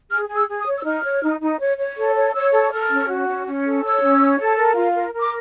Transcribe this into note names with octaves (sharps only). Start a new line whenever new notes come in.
G#4 F6
G#4
E6
G#4
D#6
C#5
E6
D#4 F6
C#5
D#4
D#4
C#5
C#5
A4
C#5
C#5 E6
A4
A4 F6
C#4
F#4
C#4
C#4
A4
C#5 E6
C#4
C#5
A4
A#4
F4
A#4
A#4
D6